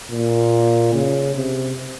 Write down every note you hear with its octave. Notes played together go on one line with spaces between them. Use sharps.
A#2
C#3
C3